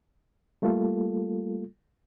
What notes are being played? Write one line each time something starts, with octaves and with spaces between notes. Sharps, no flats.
G3 A3 A#3 F4 A4